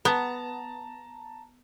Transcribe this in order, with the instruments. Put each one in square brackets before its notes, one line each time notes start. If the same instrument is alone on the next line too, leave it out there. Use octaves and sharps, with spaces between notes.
[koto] B3 [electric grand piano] A5 A#5